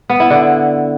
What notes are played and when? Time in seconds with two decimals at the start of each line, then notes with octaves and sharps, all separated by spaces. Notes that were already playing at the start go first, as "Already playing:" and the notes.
0.09 B3
0.20 E4
0.30 D3